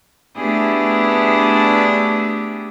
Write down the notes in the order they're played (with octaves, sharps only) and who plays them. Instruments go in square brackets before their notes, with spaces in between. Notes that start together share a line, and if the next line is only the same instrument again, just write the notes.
[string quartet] A3 B3 D4 E4 G4 G#4